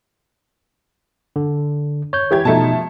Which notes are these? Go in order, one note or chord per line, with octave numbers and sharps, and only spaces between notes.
D3
C#5 G6
E3 G4 G#6
B2 F3 A3 D#4 A5